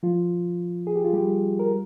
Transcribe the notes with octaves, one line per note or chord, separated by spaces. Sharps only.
F3 F4
G#4
G4
F4
G3 G4
A#4